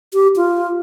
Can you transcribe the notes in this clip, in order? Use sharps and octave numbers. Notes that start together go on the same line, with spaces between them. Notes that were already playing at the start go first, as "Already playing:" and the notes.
G4
F4